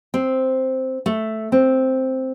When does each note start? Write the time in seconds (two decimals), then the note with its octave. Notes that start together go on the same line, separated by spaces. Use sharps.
0.14 C4
1.06 A3
1.52 C4